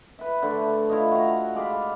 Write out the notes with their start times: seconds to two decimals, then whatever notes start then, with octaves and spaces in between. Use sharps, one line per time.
0.19 B4 E5
0.42 D3 A3
0.89 E4 F4 C#5 D#5
1.12 F#4 F5 A#5
1.55 G#3 D5 F5 B5